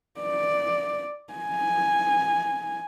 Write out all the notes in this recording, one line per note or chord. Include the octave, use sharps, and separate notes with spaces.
D5
G#5